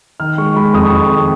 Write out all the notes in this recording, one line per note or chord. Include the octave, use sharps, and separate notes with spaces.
D#3 F6
G#3 C#6
G#3 B5
F2 D#6
C#6
F2 B5
C#6
D#3